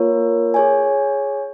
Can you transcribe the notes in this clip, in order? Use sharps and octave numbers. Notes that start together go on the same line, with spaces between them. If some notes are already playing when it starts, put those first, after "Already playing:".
Already playing: A#3 F4 A#4 C#5
G#4 C#5 G#5